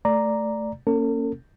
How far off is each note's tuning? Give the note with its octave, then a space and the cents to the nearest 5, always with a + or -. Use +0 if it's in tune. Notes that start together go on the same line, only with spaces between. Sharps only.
A3 +0 D5 +0 A#5 +0
A#3 -5 C#4 +0 A4 +45